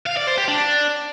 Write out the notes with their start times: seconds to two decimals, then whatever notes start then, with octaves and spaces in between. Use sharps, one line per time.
0.06 F5
0.17 D5
0.27 C5
0.38 G4
0.48 D4